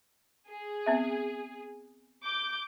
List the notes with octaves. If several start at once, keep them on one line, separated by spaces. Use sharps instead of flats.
G#4
B3 C4 E5
D6 G6